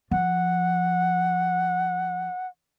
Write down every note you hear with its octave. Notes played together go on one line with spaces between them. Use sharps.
F3 F#5